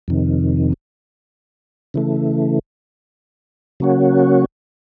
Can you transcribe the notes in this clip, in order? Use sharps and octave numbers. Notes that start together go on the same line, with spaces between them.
F2 C3 D#3
C#3 E3 A3
C#3 F#3 A#3 C#4 F#4